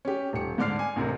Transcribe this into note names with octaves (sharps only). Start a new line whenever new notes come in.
C#4 G4
D#1 C#7
G#2 D3 D4 D5 F6 C7
G#5
A1 D2 C3 A#4